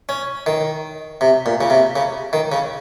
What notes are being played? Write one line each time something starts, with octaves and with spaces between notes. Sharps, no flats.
C#4
D#3
C3
A#2
C#3
C3
C#3
D#3
C#3